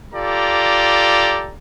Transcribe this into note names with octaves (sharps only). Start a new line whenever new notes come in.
F4 G4 A4 D5 A#5